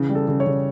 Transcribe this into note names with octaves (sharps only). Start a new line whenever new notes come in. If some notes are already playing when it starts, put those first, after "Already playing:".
Already playing: C#3 E3
G3
A4
C#3
C#5
C#3